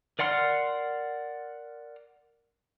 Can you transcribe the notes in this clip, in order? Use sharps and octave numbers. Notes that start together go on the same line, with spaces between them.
A#4 D5 F#5 C6 F6